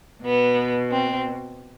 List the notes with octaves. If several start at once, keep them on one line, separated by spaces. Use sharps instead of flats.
B2 B3
C4